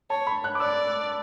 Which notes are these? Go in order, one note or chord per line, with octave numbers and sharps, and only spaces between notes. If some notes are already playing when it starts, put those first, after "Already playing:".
C#5 A5
B5
F#6
D6
D5 E6